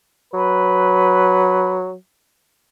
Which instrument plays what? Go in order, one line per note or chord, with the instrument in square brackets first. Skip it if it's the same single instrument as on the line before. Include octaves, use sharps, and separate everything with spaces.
[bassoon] F#3 [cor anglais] B4